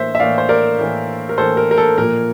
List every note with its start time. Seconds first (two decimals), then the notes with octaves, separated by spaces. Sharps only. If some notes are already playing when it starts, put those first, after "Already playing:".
Already playing: A2 E3 A#3 C5 E5
0.15 E5
0.19 A2 E3 A#3 D5 F5
0.38 C5
0.49 A#4 D5
0.78 A2 E3 A#3
1.29 A#4
1.38 A2 E3 A#3 A4 C5
1.57 A#4
1.71 A#4
1.77 A4
1.98 A#2 F3 A#3 A#4